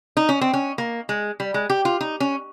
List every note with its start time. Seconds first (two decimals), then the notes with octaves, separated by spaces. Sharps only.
0.17 D#4
0.29 C#4
0.41 C4
0.53 C#4
0.78 A#3
1.09 G#3
1.40 G3
1.54 G#3
1.70 G4
1.85 F4
2.01 D#4
2.20 C#4